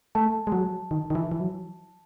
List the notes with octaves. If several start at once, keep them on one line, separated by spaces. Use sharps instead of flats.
A3 A5
G#3
F#3
D#3
D#3
E3
E3
F#3